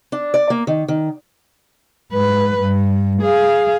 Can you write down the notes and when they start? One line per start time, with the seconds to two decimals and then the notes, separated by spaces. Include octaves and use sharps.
0.12 D4
0.34 D5
0.50 A#3
0.67 D#3
0.88 D#3
2.12 G#2 B4
2.62 G2
3.22 G#4 F5